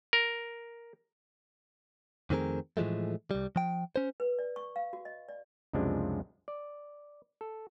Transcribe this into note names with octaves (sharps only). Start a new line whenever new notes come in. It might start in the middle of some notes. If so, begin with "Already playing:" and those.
A#4
F2 D#3 A3 C4 G#4 A#4
A2 E3 F3 G#3 A3
C2 G3
F3 G5
C#4 C5
B4
D5
C#6
F5
F#4
D#5
D5
C#2 F#2 C3 F3 G#3 D4
D5
A4